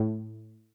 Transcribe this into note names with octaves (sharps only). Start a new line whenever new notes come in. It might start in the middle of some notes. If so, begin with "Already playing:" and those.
Already playing: A2